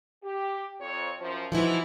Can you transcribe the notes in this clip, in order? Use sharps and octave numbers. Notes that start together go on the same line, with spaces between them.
G4
F2 C#5
F#2 F3
B2 E3 F3 D#4 E4